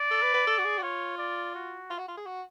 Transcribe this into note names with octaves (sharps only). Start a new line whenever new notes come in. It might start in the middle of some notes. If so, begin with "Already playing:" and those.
Already playing: D5
A4
B4
B4
A4
F#4
G#4
F#4
F4 C#5
D5
F#4
F4
F#4
F4
G#4
F#4